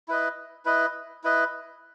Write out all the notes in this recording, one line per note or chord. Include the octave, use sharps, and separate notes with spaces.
E4 B4 D#5
E4 B4 D#5
E4 B4 D#5